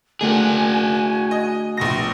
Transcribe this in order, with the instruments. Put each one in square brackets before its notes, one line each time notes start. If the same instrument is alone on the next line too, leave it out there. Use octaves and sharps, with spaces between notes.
[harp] D3 A3 A#4 [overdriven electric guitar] F#4 G#4 [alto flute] G#5
[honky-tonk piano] D#5
A#1 B2 A#6